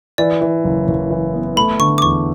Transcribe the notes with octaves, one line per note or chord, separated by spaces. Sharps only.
E3 D5
E3
F#1
F#1
E3
B3
A3 B5
D3 C#6
D6
E2 C#6